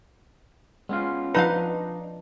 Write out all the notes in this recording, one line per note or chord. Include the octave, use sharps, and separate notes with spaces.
G#3 B3 C#4 F4
F3 D4 D#4 B4 D#5 F5